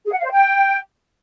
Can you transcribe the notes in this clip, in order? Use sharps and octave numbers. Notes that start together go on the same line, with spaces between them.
G#4
F#5
F5
C5
G5